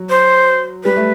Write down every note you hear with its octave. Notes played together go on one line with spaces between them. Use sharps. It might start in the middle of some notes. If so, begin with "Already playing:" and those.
Already playing: F#3
C5
G3 B4
A3